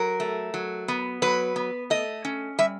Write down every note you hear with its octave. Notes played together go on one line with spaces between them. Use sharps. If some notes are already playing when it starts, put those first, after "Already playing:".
Already playing: F#3 A#4
A3
F#3
B3
F#3 B4
B3
A3 D#5
C#4
G3 E5